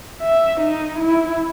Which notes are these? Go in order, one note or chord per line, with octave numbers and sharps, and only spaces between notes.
E5
D#4
E4